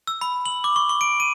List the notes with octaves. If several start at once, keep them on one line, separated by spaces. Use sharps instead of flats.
E6
B5
F#7
D6
C#6
C#6
D7
D#7